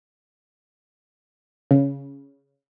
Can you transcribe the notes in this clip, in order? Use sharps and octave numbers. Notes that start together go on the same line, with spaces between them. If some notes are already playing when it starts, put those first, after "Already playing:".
C#3